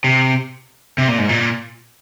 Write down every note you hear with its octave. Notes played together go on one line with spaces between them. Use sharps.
C3
C3
A#2
G#2
A#2